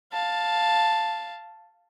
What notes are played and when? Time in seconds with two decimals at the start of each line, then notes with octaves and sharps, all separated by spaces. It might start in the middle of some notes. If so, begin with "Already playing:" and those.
0.13 F5 A5